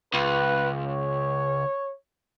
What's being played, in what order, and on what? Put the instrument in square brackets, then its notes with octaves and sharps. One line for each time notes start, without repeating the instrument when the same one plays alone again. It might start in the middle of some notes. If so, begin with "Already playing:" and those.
[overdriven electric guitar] C#2 [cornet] B4
[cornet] C#5